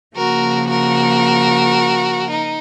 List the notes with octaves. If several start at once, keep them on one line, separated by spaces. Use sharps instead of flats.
C#3 F3 A#3 F#4 A#4
F#4 A#4
D#4